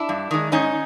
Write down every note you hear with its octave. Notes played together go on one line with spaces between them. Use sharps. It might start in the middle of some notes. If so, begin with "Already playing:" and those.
Already playing: D4 E4
G2
D#3 G#3
G#2 C#4 D#4